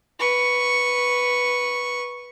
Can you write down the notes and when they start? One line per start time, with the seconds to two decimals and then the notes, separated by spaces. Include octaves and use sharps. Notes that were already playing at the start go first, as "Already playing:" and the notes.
0.19 B4 C#6